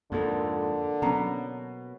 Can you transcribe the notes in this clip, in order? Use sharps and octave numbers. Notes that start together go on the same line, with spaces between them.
F2 G#2 D3 A#3 A4
B2 F#3 B3 C#4 A#5